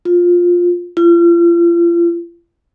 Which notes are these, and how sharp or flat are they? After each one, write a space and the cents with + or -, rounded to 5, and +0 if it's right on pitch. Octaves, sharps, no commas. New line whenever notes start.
F4 +10
F4 -35